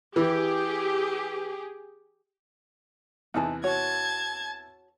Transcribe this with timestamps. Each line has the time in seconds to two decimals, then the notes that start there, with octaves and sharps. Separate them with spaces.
0.16 E3 G4 G#4
3.34 E2 C3 E3 D#4 G#4 A5
3.64 F#4 C#5 A5 G#6